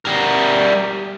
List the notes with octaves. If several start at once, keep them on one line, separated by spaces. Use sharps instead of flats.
G3 A#4